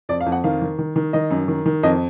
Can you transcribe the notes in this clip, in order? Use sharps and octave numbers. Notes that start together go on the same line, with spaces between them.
F2 D5
F5
F2
F#5
D#3 F5
D#3
D#3
D#3
D#3 D#5
F#2
D#3
D#3
F2 D#5